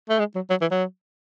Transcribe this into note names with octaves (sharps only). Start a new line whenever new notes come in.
A3
G#3
F#3
F#3
E3
F#3